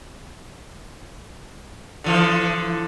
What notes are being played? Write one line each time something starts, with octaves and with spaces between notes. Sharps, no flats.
D3 E3 F3